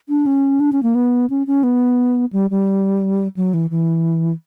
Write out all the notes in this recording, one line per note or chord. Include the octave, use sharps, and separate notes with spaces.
D4
C#4
D4
C#4
A#3
B3
C#4
C#4
B3
G3
G3
F#3
E3
E3